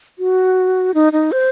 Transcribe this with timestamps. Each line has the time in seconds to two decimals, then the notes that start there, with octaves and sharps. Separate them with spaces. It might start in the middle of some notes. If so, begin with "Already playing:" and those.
0.19 F#4
0.94 D#4
1.13 D#4
1.32 C5